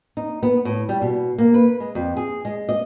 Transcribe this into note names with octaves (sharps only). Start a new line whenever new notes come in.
D#4
B3
A2
G3
B2
A#3
B4
G#3
F2
G#4
G#3
D#5